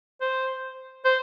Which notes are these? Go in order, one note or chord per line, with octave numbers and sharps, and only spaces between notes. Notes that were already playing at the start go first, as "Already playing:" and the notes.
C5
C5